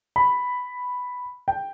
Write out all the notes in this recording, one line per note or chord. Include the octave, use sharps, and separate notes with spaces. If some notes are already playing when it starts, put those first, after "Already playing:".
B5
G5